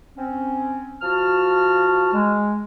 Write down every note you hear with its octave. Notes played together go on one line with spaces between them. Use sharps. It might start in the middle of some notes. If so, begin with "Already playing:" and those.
C4 C#4
F3 F#4 A5 F6
G#3